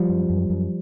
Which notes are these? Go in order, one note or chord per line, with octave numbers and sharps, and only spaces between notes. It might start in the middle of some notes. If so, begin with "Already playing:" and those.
Already playing: F3 G3
F#2
F#2
F#2